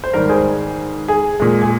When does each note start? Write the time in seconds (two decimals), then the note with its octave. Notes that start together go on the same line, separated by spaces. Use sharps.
0.04 C5
0.13 G#2 D#3 G3 A#4
0.29 G#4 C5
1.08 G#4
1.40 A#2 G#3
1.62 G#4